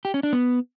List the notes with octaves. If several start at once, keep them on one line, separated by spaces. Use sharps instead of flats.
G4
C#4
D4
B3